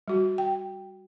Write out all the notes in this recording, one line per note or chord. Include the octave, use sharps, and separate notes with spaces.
G3 F#4
G5